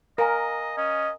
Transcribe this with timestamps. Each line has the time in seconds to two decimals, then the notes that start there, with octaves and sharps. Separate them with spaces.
0.18 A#4 D#5 F5 G#5 A#5
0.77 C#4 D#5